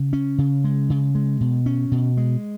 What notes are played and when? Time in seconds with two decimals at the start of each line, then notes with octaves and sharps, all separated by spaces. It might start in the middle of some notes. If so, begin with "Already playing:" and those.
Already playing: C#3
0.13 C#4
0.38 C#3
0.64 G#3
0.90 C#3
1.15 G#3
1.41 B2
1.66 C#4
1.92 B2
2.17 G#3